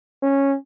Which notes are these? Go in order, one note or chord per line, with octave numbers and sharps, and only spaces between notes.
C#4